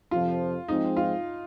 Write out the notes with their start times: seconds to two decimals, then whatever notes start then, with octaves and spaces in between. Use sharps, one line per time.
0.11 F2 C3 F3 F4
0.68 F3 G#3 C4 D#4
0.97 F4